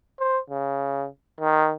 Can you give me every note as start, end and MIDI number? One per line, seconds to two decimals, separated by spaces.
0.20 0.38 72
0.50 1.06 49
1.40 1.74 51